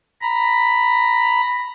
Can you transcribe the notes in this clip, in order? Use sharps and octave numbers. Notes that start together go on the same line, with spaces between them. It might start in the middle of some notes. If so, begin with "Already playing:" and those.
A#5 B5